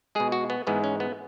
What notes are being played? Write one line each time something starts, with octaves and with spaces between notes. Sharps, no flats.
B2 G#3 G#4
F#4
B3
G#2 E3 G#3 B3
C#4
B3